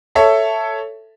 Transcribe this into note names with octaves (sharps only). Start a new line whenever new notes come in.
A4 C#5 E5